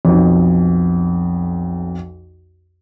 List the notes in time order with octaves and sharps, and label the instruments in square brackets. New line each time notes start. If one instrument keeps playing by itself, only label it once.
[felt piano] B1 F2